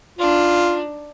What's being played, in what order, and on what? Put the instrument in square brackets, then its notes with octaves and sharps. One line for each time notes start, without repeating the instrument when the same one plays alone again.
[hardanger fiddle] D4 D#4 [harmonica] F4